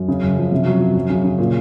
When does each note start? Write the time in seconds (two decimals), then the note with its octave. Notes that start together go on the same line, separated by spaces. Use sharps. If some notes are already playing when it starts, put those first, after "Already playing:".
Already playing: F#2
0.08 C#3
0.23 F#2
0.37 F3
0.52 C3
0.66 F#3
0.81 F#3
0.95 F#2
1.10 C#3
1.24 C#3
1.38 A#2